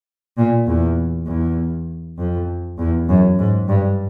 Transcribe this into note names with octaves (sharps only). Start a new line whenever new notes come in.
A#2
E2
E2
F2
E2
F#2
G#2
G2